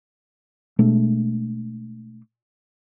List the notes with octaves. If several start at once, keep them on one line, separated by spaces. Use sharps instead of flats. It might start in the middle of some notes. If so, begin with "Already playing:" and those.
B2 G#3 A3 D4